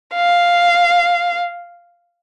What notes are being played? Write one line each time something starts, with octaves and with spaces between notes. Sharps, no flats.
F5